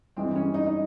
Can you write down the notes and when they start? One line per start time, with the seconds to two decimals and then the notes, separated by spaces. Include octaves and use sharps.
0.17 G2 E3 G#3 C4
0.36 C#4
0.54 D#4
0.66 D#4